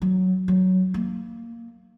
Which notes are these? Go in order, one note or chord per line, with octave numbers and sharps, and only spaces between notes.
F#3
F#3
A#3